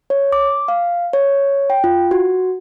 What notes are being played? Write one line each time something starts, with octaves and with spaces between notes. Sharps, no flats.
C#5
D6
F5
C#5
G5
F4
F#4